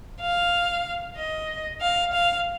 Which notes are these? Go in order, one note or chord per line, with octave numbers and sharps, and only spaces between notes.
F5
D#5
F5
F5